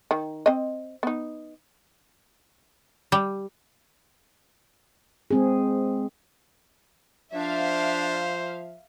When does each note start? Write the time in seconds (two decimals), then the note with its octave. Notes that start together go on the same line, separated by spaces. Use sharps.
0.11 D#3
0.46 C4 D#5
1.03 B3 D#4
3.12 G3
5.31 G#3 C4 G#4
7.34 F3 D4 C5 E5 F5